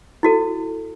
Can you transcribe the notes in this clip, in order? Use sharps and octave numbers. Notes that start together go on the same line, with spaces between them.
E4 F#4 A4